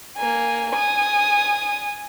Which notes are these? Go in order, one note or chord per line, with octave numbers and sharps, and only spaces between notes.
A#3 G#5
G#5 D#6